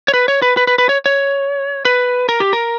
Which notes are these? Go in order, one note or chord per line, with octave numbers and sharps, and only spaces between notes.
C#5
B4
C#5
B4
B4
B4
B4
C#5
C#5
B4
A#4
G4
A#4